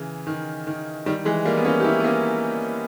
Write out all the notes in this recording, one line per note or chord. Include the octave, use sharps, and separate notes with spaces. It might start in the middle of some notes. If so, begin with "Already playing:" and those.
Already playing: C#3 E3
D#3
D#3
D#3 G3
E3 G#3
G3 A#3
B3
A#3 C#4
G4
C#4 E4
B3
A#3 C#4